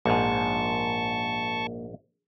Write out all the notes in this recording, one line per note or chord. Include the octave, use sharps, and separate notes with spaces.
A#1 G#2 A#3 A5 C#6